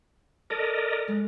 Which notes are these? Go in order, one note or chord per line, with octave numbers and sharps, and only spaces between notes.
A4 A#4 D5 D#5
G#3